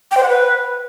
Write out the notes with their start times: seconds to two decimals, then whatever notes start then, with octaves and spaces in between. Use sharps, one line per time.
0.11 G5
0.17 C5
0.23 F#5
0.29 B4